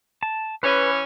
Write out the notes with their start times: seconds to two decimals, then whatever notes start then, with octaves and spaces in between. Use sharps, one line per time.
0.23 A5
0.63 E3 C#4 B4